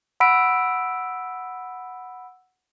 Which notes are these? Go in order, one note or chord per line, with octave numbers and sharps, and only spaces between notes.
F#5 B5 E6 B6 D7